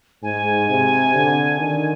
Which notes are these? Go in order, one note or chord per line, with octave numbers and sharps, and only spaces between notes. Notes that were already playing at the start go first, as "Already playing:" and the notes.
G#2 G#5
C3
D3
D#3